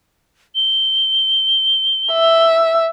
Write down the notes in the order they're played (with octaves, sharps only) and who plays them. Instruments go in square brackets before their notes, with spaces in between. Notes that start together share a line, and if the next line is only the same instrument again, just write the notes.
[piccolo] G7
[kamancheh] E5